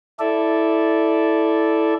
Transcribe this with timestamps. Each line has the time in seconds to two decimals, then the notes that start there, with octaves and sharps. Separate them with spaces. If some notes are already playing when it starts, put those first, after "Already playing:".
0.19 E4 A4 D5 E5